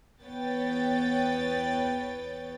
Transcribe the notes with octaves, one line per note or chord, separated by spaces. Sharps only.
E2 B3 B4 C#5 G5 A6